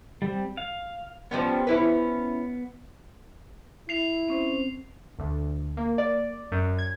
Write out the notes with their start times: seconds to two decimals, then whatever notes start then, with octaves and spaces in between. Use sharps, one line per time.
0.22 G3 C4
0.57 F5
1.31 F3 G3 B3 C#4
1.67 C#4 E4 B4
3.89 E4 C7 F7
4.28 C4 C#4 C5
5.19 D2
5.77 A#3
5.98 D5
6.52 F#2
6.78 G#6